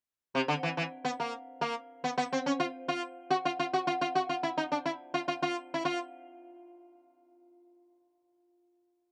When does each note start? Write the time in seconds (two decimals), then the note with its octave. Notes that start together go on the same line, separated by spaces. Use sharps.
0.35 C3
0.48 D3
0.63 E3
0.77 E3
1.05 B3
1.20 A#3
1.61 A#3
2.04 B3
2.18 B3
2.33 C4
2.46 C#4
2.60 F4
2.88 F4
3.30 F#4
3.45 F4
3.59 F4
3.73 F#4
3.87 F4
4.01 F4
4.15 F#4
4.29 F4
4.43 E4
4.58 D#4
4.72 D4
4.86 E4
5.14 F4
5.28 F4
5.42 F4
5.74 E4
5.85 F4